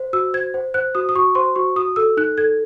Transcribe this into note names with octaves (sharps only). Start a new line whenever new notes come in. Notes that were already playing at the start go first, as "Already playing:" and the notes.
Already playing: C5
F#4 E6
C5 G#6
C5
C5 F#6
F#4 D#6
D#6
F#4 C#6
C5 C6
F#4 C#6
F#4 D#6
A4 E6
D#4 F#6
A4 G#6